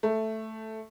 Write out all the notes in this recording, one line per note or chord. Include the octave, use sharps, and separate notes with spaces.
A3